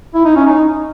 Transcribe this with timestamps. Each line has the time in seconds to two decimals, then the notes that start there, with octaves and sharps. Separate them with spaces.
0.15 E4
0.25 D#4
0.36 C#4
0.47 D#4